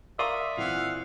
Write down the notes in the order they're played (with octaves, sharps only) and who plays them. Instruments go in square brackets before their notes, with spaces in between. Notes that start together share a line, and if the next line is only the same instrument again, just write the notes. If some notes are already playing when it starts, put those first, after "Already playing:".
[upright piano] A#4 F5 C#6 [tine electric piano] D5 C6 D#6 [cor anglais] E5
[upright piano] A#2 E3 C4 [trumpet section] F5 F#5